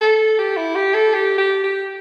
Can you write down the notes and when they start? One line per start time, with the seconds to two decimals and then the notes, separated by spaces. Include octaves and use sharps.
0.01 A4
0.39 G4
0.57 E4
0.75 G4
0.94 A4
1.14 G4
1.38 G4
1.63 G4